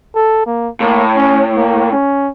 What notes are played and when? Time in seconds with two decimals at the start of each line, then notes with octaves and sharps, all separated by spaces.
0.15 A4
0.47 A#3
0.80 A2 A#3
1.16 C#4
1.57 A#3
1.92 C#4